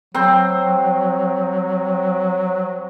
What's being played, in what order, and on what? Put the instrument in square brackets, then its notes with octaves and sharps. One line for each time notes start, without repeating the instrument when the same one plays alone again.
[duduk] F#3 [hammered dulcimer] C4 C5